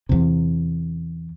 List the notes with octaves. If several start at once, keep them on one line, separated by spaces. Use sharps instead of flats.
E2 C3